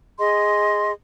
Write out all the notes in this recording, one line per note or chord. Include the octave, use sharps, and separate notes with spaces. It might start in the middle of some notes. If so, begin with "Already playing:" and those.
G#4 D#5 C6